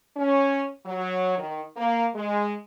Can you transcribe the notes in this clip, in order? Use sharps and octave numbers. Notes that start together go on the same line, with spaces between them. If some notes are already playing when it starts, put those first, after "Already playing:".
C#4
F#3
D#3
A#3
G#3